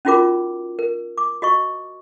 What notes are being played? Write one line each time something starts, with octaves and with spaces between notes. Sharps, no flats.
C#4 D#4 F4 F#4 A#4 D6
A#4
D6
F#4 D#5 C#6